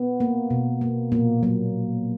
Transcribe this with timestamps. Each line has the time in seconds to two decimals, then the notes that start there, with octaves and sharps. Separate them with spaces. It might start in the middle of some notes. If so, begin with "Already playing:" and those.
Already playing: B3
0.20 A#3
0.50 B2
0.81 A#3
1.12 A#2 A#3
1.43 F#3 A#3